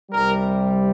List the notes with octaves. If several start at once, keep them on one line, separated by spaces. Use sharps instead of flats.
C2 C3 G3 A#4